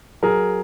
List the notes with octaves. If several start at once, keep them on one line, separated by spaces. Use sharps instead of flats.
F#3 G#4 A#4